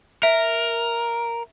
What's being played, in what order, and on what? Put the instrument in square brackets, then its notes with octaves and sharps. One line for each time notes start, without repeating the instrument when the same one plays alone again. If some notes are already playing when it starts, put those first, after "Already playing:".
[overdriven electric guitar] A#4 [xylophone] E5